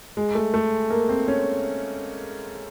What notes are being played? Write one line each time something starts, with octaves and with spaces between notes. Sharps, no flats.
G#3
A3
A3
A#3
C4
C#4